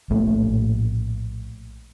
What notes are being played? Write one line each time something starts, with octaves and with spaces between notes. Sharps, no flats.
A#1 A2 A3 A#3